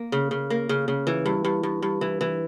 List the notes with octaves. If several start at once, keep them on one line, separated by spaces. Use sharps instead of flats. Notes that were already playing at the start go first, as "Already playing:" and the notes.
Already playing: A#3
C#3
C#3
A#3
C#3
C#3
E3
G2
G2
G2
G2
E3
E3